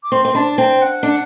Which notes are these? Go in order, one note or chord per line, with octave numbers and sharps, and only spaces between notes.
D6
C4 C6
C4
D4 A5
C4 G5
F#5
D4